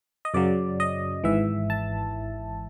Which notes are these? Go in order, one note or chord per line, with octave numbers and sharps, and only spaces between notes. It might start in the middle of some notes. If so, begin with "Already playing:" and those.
D#5
F#2 C#3 F#3 D5
D#5
G#1 G#2 E3 E5
A5